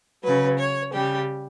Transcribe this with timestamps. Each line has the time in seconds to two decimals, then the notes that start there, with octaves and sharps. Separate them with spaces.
0.23 C#3 F#3 B4
0.59 C#5
0.93 C#3 G3 G4